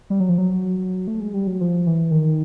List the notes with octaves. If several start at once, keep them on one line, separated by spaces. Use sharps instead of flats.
G3
F#3
F3
F#3
A3
G#3
G3
F#3
F3
E3
D#3